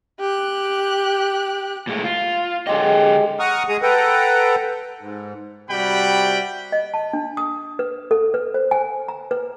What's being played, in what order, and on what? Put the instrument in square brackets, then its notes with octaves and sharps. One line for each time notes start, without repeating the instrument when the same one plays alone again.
[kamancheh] G4 F#6
[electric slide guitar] A#2 G#3 A3
F4
[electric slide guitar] D3 A4 D#5 [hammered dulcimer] F#3 G#3 G4
[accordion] F#5 A#5 C#6 D#6 F6
G#3 G#4 A#5 D#6
A4 B4 F#5 G5 A#5
G#2
[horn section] C3 G3 F#4 F#5 G5 B5
[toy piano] D#5
A5
D4
D#6
B4
A4
B4
C5
G#5
A#5
B4